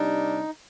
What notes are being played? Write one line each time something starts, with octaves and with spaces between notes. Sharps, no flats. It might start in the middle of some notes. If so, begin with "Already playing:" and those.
Already playing: C3 G3 D4 D#4